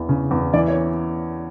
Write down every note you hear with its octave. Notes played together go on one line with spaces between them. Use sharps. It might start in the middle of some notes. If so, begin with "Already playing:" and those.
Already playing: E2 E3
C#3
E2
E3 D5
C#5